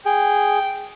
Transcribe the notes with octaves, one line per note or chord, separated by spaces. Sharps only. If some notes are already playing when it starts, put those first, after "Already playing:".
G#4 G5